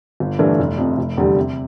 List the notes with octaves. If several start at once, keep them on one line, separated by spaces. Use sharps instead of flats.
G1
G2 E3 A3 D4
F1
F2 C3
F1
E2 D3 G3
C3